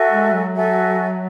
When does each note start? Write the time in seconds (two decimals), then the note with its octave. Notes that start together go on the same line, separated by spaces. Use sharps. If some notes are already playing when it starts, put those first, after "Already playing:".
Already playing: F#4 A4 E5 G#5
0.10 G#3
0.32 F#3
0.54 F#4 A4 E5 G#5